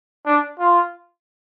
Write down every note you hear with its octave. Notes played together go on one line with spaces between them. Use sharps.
D4
F4